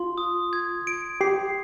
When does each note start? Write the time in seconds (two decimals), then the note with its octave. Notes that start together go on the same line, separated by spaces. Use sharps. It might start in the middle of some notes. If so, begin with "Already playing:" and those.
Already playing: F4 C6
0.18 D#6
0.53 G#6
0.87 D7
1.21 G4 C7